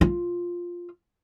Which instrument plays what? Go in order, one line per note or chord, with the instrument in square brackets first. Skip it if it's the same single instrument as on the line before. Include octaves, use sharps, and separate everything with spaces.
[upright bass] F4